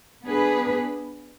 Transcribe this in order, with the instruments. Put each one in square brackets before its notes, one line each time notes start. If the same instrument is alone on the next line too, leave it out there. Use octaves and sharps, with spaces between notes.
[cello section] B3 D4 G#4 B4